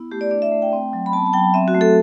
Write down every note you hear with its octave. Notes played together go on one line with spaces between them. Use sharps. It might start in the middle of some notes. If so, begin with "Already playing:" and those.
Already playing: B3 E4
A3 G4
D5
D4 D5
E5
A3
G5
C4
F#3
B5
B3 A5
A5
F#3 G5
C4 E5
F#4
A3
A4